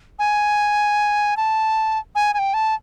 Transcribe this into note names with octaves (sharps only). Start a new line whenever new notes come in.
G#5
A5
G#5
G#5
G5
A5